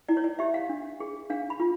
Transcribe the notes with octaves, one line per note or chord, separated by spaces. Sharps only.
E4 D5
C#5
D5
G4 E5
F5
D4
G#4
D4 F5
B5
F4